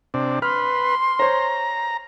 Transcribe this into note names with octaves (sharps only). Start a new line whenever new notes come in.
C3 D4
B4 C6 F6
C5 C#5 A#5